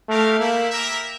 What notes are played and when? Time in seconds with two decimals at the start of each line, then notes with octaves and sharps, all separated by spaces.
0.09 A3 C4 G4 A#4 F5
0.39 A3 A#3 C4 E4
0.70 E4 G4 A#4 E5